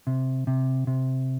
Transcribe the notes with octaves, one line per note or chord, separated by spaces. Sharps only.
C3
C3
C3